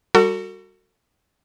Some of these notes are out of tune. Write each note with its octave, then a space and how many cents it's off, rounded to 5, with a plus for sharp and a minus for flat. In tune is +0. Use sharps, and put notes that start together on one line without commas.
G3 +0 F#4 +0 A4 +40